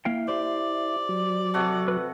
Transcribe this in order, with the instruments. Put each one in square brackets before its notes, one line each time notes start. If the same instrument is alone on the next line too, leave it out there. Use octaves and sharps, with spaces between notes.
[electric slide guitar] A#3 F5 G5 [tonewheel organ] E4
[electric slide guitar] G4 C5 [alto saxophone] D5
[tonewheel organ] F#3
[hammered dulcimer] C3 F#4 A4
[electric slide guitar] B4